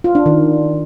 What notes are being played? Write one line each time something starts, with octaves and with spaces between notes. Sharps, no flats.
F4
D4
D#3